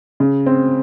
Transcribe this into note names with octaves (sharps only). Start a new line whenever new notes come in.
C#3
C4